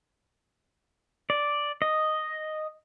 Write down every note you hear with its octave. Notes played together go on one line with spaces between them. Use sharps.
D5
D#5